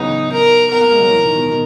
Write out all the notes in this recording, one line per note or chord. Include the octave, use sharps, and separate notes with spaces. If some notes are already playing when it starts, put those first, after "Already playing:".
Already playing: C#3 E3 F#3 B3 D#4
A#4
B3 A#4
A#3
G#3
F#3
E3
D#3
B2
B2